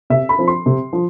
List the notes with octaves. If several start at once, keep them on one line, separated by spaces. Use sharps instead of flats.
C3 E5
B5
F3 C4
C6
C3
F3